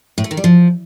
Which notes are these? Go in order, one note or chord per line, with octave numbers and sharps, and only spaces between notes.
A2
A3
D#3
G3
F3